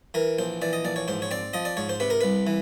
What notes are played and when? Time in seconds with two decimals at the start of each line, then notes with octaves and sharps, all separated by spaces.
0.14 E3 A#4
0.39 A#1 C5
0.62 E3 D5
0.73 D#5
0.85 A#1 D5
0.96 C#5
1.08 G#2 C5
1.22 C#5
1.31 C4 D5
1.53 F3 D#5
1.65 D5
1.77 G#2 C#5
1.89 C5
2.00 C3 B4
2.10 A#4
2.21 C2 B4
2.47 E3